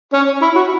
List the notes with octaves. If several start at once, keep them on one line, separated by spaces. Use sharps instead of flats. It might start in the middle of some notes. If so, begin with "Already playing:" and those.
C#4
E4
F#4